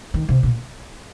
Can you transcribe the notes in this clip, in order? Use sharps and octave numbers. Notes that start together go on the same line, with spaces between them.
D#3
C3
A#2